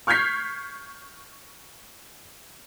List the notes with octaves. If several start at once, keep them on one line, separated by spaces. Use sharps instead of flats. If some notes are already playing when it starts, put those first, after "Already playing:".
C#6 F6 G6 G#6 B6 C7